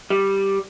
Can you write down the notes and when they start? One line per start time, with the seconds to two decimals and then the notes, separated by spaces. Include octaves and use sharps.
0.10 G3